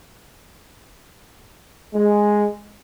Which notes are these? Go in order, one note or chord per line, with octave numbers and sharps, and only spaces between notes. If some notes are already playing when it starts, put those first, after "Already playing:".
G#3